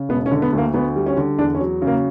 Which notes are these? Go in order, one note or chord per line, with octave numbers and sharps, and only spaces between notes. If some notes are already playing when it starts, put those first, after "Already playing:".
Already playing: C#3
E1 B3
C#4
D3
B3
D2
A#3
D2 B3
G3
C#4
D3
E2 D4
C#4
F#3
C#3
A#3